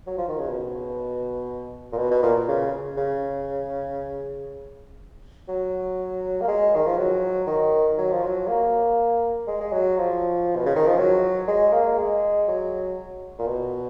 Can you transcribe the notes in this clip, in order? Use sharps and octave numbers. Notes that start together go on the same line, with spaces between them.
F#3
F3
D#3
C#3
B2
A#2
B2
B2
A#2
C#3
C#3
F#3
A#3
G#3
D#3
F3
F#3
D#3
F#3
F3
F#3
A#3
G#3
G#3
F#3
F3
B2
C#3
D#3
F3
F#3
G#3
A#3
G#3
F#3
A#2
B2